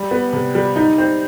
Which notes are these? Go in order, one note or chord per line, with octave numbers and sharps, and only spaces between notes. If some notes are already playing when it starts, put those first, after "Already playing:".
Already playing: G3
B3
C3
G3
D#4
C4